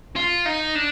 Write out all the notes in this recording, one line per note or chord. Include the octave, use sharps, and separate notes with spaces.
F4
D#4
D4